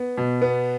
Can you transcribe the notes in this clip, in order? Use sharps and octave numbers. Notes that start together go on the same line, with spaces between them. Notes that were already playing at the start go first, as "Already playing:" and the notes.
Already playing: B3
B2
B3